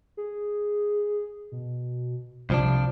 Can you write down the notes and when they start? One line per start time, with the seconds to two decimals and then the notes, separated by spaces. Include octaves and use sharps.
0.17 G#4
1.52 B2
2.50 C2 C3 F3 D4